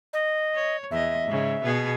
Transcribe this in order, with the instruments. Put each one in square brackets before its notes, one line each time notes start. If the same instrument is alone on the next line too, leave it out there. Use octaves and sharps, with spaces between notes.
[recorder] D#5
[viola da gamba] C#5
[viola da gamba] E2 D#5 [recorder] E5
[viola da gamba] G#2 C#3
B2 B3 G#4